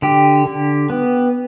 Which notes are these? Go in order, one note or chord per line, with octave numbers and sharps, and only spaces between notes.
D3 G4
D3
B3